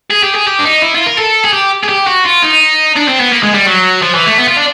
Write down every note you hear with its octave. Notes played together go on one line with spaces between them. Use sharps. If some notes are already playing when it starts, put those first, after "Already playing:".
G#4
G4
G#4
G4
D4
D#4
E4
F4
A#4
A4
G#4
G4
G#4
G4
F#4
F4
D#4
D4
C4
B3
A#3
G#3
G3
F#3
F3
E3
A3
B3
F4
D4